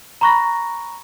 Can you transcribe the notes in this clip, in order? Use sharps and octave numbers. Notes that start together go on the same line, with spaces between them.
A#5 B5 C#6 F#6 A#6